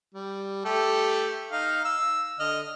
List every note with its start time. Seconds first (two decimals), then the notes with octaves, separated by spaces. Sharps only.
0.15 G3
0.65 A3 G4 A4
1.51 D#4 F5
1.85 E6
2.40 D3 D#5 F6